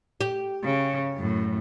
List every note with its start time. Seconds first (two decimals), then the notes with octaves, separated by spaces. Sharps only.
0.21 G4
0.63 C#3
1.15 F#2 A2